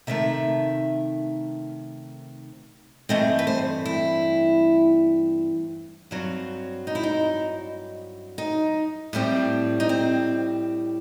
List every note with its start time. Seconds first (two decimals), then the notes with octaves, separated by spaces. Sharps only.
0.07 C3 D#3 A3 E5
3.09 G2 E3 A3 C4 D#5
3.39 B4
3.47 C5
3.85 E4
6.11 G2 F#3 C4
6.87 D#4
6.95 E4
7.03 D#4
8.38 D#4
9.13 A2 G3 C4
9.80 D#4
9.89 C4